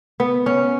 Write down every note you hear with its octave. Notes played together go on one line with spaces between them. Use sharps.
B3
C#4